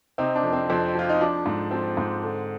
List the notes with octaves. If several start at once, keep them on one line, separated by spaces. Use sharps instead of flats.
C3 C4 D#4
D4
F2
C4
F2 C4
F3 F4
D#4
F3 D4
G#2
F3 C4
G#2
D3